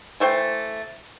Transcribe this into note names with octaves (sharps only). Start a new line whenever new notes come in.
E3 A3 C5 G5